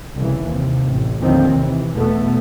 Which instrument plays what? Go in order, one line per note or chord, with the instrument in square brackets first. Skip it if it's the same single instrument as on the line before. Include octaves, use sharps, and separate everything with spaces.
[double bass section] C2 C#3 E3
D#2 C3
A1
D#2 A2 D3 D#3 F3 C4
C3 E3
E2 B2 A3 B3